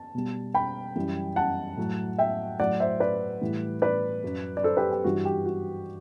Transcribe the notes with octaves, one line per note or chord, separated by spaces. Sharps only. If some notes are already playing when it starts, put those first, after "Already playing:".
Already playing: A5
B2 G3
G5 B5
F#2 E3 G3
F#5 A5
A2 F#3
E5 G5
A2 F#3 D5 F#5
C5 E5
B4 D5
A2 E3 G3
B4 D5
F#2 F#3
D5
A4 C5
G4 B4
G4
G2 E3 G3 F#4
G4
F#4